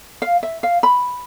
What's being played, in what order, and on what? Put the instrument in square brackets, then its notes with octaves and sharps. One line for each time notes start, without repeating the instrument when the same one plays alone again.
[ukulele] F5
E5
F5
B5